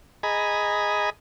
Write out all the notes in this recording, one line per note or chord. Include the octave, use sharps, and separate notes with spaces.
G#4 D#5 G#5 A#5 B5